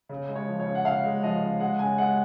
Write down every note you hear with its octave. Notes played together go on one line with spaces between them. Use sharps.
C#3
G#3
C#5
F3
C#5
C#3
F#5
C#3 F5
G#3
F3 D#5
C#3
G#3 F#5
C#3 G#5
G#3 F#5